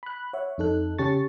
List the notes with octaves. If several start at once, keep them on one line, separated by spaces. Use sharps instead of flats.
B5 F#6
C#5 E5 F#5
F2 D#4 A4 F#6
C#3 C#4 G4 A5 C#6 A6